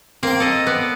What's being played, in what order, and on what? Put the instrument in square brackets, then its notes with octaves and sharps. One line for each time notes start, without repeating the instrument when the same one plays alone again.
[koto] A#3 [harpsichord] C4 G5
[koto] A4 D#5
B3 D5